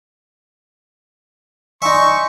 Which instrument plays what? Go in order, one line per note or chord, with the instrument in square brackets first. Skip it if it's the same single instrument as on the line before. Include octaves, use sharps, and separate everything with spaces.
[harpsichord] D#4 E5 [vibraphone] D5 G#5 C6 [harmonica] C#6